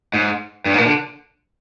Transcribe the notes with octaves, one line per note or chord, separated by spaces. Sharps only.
G#2
G2
G#2
A#2
D3